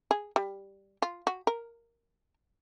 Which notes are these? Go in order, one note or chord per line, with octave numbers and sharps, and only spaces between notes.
G#4
G3
F4
F#4
A#4